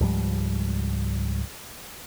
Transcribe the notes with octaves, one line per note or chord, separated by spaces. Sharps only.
C#2 G#2 F3 G3